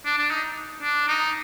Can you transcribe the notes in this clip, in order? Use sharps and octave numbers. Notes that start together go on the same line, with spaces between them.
D4
D4
D#4
D4
D#4